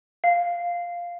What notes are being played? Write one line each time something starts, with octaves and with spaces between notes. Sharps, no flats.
F5